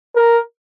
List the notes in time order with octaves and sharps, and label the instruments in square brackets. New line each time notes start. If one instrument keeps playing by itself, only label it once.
[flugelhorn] A#4